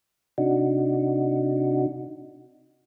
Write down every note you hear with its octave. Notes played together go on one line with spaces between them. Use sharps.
C3 D4 D#4 F#4